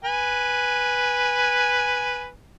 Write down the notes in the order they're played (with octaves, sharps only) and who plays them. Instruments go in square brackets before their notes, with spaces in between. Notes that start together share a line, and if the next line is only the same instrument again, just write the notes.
[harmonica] B4 G#5